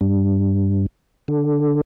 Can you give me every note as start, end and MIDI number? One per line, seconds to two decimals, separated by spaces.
0.01 0.86 43
1.28 1.81 50